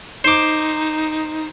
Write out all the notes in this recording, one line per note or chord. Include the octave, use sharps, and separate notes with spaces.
D#4 C5 D6